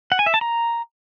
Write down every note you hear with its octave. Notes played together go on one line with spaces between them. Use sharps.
F#5
G#5
E5
A5
A#5